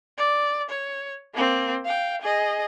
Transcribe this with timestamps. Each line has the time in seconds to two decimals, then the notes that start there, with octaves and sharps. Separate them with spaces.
0.18 D5
0.70 C#5
1.34 A#3 C4
1.85 F5 G5
2.22 G#4 D#5